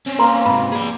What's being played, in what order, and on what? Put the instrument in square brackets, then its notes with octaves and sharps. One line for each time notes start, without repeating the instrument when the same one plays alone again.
[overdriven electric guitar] C4 C#4
[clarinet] A#3 [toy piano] B4 A#5 C6
[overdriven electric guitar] G#2 C3 [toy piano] B5
[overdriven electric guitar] G#4 D5